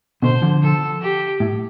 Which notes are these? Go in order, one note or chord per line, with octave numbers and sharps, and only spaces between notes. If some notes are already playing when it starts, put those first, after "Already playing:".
B2 D3 C5
D3 F3
A4
G4
A2